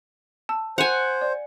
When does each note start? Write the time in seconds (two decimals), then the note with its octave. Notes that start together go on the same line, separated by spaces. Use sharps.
0.49 A5 E6
0.78 C5 F#5 G#5 E7 F7
1.21 D5